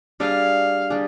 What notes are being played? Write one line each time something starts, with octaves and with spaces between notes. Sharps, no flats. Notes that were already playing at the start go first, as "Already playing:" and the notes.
G3 D4 G#4 F5
G3 D4 G#4